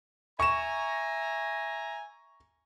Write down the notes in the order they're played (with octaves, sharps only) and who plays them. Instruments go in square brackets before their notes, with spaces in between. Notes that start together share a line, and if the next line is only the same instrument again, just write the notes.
[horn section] E5 G#5 A#5 [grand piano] C#6 E7